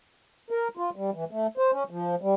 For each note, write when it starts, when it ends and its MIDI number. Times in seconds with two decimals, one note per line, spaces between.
0.50 0.68 70
0.77 0.90 65
0.96 1.10 55
1.14 1.25 52
1.31 1.47 57
1.57 1.71 72
1.72 1.84 61
1.90 2.15 53
2.22 2.35 55